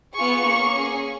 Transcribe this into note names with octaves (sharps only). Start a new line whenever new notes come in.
B3 F4 G#4 C#6
A#3 C#4 G#4
C#4 G#4